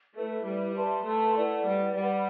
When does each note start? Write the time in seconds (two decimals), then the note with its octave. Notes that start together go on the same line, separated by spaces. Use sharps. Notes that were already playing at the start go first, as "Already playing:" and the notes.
0.15 A3 E4 B4 E5
0.45 G3
0.75 B4 E5 A5 C6
1.06 A3
1.36 E4 B4 D5 F#5
1.66 G3
1.96 G3 B4 F#5 B5